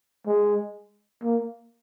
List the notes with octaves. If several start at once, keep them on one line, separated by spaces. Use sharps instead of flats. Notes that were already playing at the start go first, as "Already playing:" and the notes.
G#3
A#3